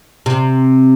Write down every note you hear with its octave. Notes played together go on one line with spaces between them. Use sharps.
C3